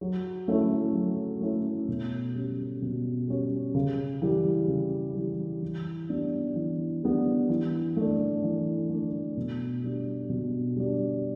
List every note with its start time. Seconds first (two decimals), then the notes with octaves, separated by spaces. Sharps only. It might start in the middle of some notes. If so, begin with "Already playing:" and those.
0.01 F#3
0.48 A3 C#4 E4
0.94 F#3
1.41 A3 C#4 E4
1.88 B2
2.35 G3 C#4
2.82 B2
3.28 G3 C#4
3.74 C#3
4.22 E3 G3
4.68 C#3
5.15 E3 G3
5.62 E3
6.09 G3 B3 D4
6.56 E3
7.03 G3 B3 D4
7.49 E3
7.97 A3 D4
8.44 E3
8.89 A3 D4
9.37 B2
9.83 G3 D4
10.30 B2
10.76 G3 D4